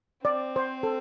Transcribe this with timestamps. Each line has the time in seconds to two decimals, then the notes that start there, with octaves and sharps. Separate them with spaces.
0.25 C4 D5
0.56 C5
0.83 A4